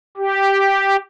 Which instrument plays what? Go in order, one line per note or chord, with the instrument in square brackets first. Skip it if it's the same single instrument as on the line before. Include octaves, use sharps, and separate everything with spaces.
[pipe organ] G4